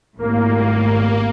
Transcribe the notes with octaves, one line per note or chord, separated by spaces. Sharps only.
G#1 A2 G3 A#3